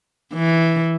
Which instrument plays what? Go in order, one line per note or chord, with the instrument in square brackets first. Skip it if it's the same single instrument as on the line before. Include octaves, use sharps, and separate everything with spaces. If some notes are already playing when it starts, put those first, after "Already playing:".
[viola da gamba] E3